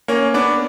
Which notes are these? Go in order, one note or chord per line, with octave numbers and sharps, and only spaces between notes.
A#3 C#4
B3 D4